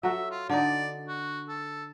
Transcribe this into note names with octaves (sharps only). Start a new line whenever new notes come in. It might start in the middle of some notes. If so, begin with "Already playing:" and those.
F#3 F#4 A4 E5
F4
D3 D#4 D5
F#4
A4